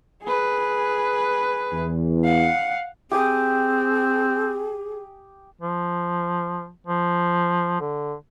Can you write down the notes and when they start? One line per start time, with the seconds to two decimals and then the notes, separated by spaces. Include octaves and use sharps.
0.23 G#4 B4
1.72 E2
2.24 F5 F#5
3.11 C4 G4 G#4 G#5 D#6
5.61 F3
6.87 F3
7.81 D3